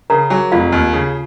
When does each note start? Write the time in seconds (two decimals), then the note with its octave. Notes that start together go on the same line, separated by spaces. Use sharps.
0.10 C#3 A#4 A#5
0.30 F#3 G#4 G#5
0.52 F1 F4 F5
0.72 D#2
0.93 C#3